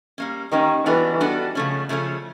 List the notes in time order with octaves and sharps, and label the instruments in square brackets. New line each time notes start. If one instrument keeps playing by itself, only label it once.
[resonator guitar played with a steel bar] G3 A#3 C#4
[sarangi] D#3 [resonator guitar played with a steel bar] G3 A#3 C#4
[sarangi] E3 [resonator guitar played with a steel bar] G3 B3 D4 F#4 A4
[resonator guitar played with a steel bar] G3 B3 D4 F#4 A4
C#3 F3 A3 C#4
C#3 F3 A3 C#4